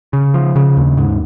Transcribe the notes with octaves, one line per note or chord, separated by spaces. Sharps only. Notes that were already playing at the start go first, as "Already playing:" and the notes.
C#3
F3
C#3
D#2
G#2